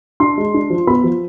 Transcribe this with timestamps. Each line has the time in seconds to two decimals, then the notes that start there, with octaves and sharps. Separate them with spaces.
0.20 D4 C6
0.38 G#3
0.54 D4
0.70 F3
0.87 B3 B5
1.03 F3